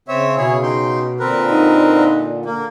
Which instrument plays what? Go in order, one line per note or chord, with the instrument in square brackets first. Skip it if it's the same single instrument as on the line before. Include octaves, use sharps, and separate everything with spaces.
[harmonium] C#3 [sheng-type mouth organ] C4 C#5 E5
[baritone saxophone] B2 [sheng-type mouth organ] E4 G#4 C#5
[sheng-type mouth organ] D#4 G5 C6
[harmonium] A#2 D3 [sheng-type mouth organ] C4 A#4 B4
[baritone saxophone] D#4
[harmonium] D3 [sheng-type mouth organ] A#3